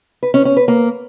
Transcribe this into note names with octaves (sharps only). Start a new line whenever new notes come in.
B4
C#4
C#4
B4
A#3